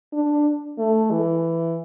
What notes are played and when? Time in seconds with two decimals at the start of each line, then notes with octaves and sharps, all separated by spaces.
0.13 D4
0.78 A3
1.11 E3